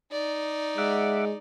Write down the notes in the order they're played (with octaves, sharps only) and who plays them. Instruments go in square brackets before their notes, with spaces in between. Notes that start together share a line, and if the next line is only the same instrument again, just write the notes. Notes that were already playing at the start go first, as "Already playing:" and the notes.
[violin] D#4 D5
[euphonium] G#3 [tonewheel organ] E5 F#5 D6